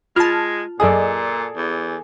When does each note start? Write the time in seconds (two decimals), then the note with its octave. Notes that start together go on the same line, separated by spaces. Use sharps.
0.16 G#3 F4 A5 F6
0.80 F#2 A#2 G#4 A4 D5 D#5
1.56 E2